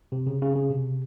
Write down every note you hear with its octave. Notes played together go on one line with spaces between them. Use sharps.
C3
C#3
C#3
C#3
C3